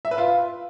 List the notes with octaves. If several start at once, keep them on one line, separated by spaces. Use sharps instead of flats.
E5
B4
F4